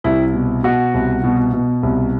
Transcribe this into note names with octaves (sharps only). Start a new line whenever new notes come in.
C2 E4
B2
B2 F#4
C2
B2
B2
C2